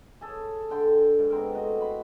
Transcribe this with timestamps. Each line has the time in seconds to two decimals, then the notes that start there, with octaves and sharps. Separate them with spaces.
0.21 G#4 A4 C#5
0.70 D3 G5 C6
1.19 G#2
1.30 B3 C4 A#4
1.54 A2 F#4 D#5
1.81 B5 C6